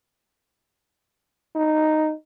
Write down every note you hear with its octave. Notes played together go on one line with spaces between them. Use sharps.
D#4